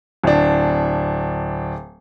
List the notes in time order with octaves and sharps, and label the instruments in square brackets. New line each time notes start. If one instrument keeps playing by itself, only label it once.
[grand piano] D1 D4